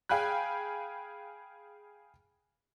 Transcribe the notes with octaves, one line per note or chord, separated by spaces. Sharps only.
G#4 F5 G5 G#5 B5 F#6